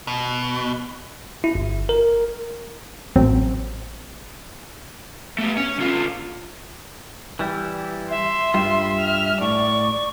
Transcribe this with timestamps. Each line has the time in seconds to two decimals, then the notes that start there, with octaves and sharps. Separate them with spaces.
0.07 B2
1.44 E4
1.55 G1
1.89 A#4
3.16 A1 F#3 C4
5.39 A3 G4
5.57 C#4
5.80 D3 F4
7.39 E3 G3 E4
8.11 E5 C6
8.54 G2 G3 F4 E5
8.99 F6
9.41 A2 D5 C#6